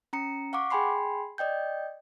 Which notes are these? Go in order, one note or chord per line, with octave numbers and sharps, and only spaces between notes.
C#4 A#5 C#7
F5 F#5 C#6 D6
G#4 G5 G#5 B5 C6 C7
D5 D#5 G5 G6